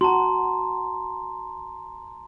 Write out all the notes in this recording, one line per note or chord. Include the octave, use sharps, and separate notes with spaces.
F#4 A5 A#5 C6